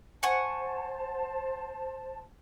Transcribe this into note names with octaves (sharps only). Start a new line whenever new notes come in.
C5 F#5 G#5 A5 C#6